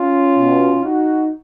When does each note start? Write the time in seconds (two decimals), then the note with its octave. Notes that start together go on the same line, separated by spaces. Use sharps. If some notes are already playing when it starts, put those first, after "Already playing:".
Already playing: C#4 F4
0.36 B2
0.83 D#4 F#4